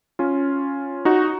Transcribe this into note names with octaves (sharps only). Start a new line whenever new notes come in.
C#4 F4
D#4 F#4